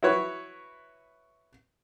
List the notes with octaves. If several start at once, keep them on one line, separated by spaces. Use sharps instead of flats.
E4 F#4 B4 C#5